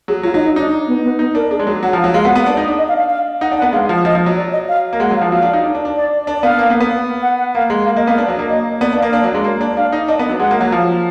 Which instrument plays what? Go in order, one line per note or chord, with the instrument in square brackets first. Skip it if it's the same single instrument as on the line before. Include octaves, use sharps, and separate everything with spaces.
[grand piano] F#3 [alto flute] G#4
[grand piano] F#3 [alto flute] F4
[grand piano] F#3 [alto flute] D#4
[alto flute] D#4
[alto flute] D4 [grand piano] D#4
[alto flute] B3
B3
[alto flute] B3 [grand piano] D#4
[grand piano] D4 [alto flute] A#4
[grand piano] D4 [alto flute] G#4
[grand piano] G#3
[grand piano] F#3 [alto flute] G#4
[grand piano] F#3 [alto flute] F#5
[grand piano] F3
[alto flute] F5
[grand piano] F#3
[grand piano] G#3 [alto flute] F5
[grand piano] B3 [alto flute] F#5
[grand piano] B3
D4
D#4
D4
[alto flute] D#5
F5
F5
F5
[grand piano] D#4 [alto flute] F#5
[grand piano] D4
[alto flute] F#5
[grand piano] B3
[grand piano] G#3 [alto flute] F5
[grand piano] F3
[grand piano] F3 [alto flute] D#5
[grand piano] F3
F#3
[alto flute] D5
D#5
F5
[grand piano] A#3
[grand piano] G#3 [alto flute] F#5
[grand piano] F#3
[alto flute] F5
[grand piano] F3
[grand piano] F#3 [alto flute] F5
[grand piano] D4
D#4
D4
D4
D4
[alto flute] D5
[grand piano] D4 [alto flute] D5
[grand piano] B3 [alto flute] F5
[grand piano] A#3
B3
B3
[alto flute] F#5
F#5
[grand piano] A#3 [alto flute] F5
[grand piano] G#3
[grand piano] A#3 [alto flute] F5
[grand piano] A#3 [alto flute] D#5
[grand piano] B3 [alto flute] F5
[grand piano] D4
F#3
A#3
[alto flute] D#5
[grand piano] B3 [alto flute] D5
[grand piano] D4
[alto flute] F5
[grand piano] A#3
D4
F#3
G#3
A#3
D4
[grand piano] D4 [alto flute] F5
[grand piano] D#4
[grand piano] D4 [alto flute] D#5
[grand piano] B3
F#3
[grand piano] G#3 [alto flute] F#5
[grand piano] A#3
F#3
[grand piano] F3 [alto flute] F5